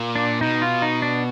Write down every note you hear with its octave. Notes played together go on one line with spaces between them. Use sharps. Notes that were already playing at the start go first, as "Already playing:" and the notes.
Already playing: A#2
D4
B2 D#4
F4
D#4
D4